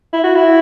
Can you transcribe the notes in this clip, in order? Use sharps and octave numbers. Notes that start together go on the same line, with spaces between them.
E4
F#4
E4